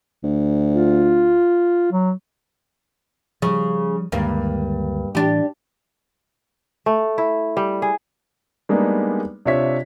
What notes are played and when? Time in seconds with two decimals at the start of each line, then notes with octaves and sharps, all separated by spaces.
0.24 D2
0.74 F4
1.92 F#3
3.42 C#3 F3 G3
4.12 D2 G2 D#3 G#3 A#3
5.15 A2 E3 D4 G4
6.86 A3
7.18 E4
7.57 G3
7.82 G#4
8.69 G3 G#3 A#3 B3 D4 D#4
9.45 C3 D4 F4 C#5 E5 B6